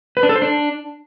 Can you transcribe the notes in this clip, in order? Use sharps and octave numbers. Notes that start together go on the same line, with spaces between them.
B4
D4
A4
C5
D4